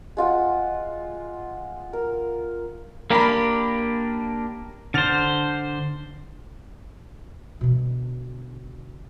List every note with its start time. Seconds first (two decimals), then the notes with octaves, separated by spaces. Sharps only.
0.17 G#3 F4 F#5
1.93 A#4
3.10 A#3 D4 G4 A#4 A#5 B5
4.94 D3 C5 F6 A6 F7
7.61 B2 D3